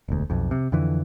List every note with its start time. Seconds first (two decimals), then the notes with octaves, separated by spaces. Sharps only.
0.08 E1 D2
0.30 B1 F2
0.51 C3
0.72 F2 D3 E3